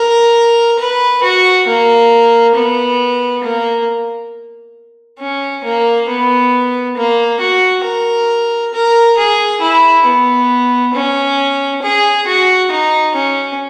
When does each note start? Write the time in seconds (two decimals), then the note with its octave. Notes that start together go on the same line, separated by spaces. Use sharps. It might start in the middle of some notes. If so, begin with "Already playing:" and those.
Already playing: A#4
0.79 B4
1.23 F#4
1.67 A#3
2.55 B3
3.44 A#3
5.20 C#4
5.64 A#3
6.08 B3
6.97 A#3
7.40 F#4
7.84 A#4
8.73 A#4
9.18 G#4
9.61 E4
10.05 B3
10.93 C#4
11.82 G#4
12.27 F#4
12.71 D#4
13.14 C#4